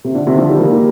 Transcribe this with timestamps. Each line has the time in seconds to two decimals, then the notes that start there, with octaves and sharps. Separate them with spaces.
0.05 C3
0.15 D3
0.27 C3 D#3
0.38 D3 F3
0.49 D#3 G3
0.60 G3 A#3